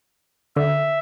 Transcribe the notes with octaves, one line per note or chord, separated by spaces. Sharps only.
D3 E5